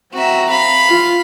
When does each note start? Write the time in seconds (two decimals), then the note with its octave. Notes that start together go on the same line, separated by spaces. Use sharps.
0.13 C4 F#4 E5 A#5
0.49 F5 B5
0.90 F4